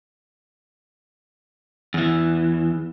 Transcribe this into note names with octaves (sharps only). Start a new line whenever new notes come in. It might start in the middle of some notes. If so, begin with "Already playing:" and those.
E2 E3